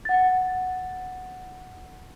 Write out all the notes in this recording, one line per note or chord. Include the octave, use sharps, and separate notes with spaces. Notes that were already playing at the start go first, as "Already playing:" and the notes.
F#5 A6